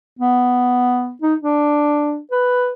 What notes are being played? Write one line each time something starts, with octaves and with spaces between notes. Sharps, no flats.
B3
D#4
D4
B4